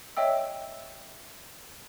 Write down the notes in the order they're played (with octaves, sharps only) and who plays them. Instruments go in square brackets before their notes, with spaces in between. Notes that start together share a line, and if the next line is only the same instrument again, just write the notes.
[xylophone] C#5 D#5 E5 G5 E6